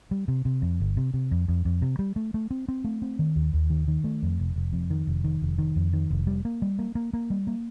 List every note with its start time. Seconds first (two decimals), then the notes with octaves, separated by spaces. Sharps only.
0.11 G3
0.28 C3
0.45 C3
0.62 F2
0.80 G1
0.97 C3
1.14 C3
1.31 F2
1.48 F2
1.65 F2
1.82 C3
1.99 G3
2.16 A3
2.34 A3
2.51 C4
2.68 C4
2.84 A3
3.02 C4
3.19 D#3
3.36 D#2
3.53 D#2
3.70 D#3
3.88 D#3
4.04 A3
4.23 F2
4.39 F1
4.56 F1
4.73 F2
4.90 D#3
5.07 F1
5.24 D#3
5.42 F1
5.58 D#3
5.76 F2
5.93 D#3
6.10 F1
6.27 G3
6.45 A#3
6.62 G3
6.79 A#3
6.95 A#3
7.13 A#3
7.30 G3
7.47 A#3